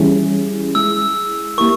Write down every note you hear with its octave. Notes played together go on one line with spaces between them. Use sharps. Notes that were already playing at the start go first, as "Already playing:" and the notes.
Already playing: E3 G3 C#4 E4 G#4
G#3 E4 G#4 E6
A#3 E4 G4 A#4 C#6